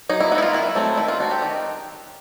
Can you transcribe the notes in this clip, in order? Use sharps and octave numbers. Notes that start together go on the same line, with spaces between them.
F#3 D#4
E4
B3 D#4 E4 F#4
F4
D#3 E4
F#3 A3 C4
D#3 E4
F4
F#3 A3 C4 F#4
G4
D#3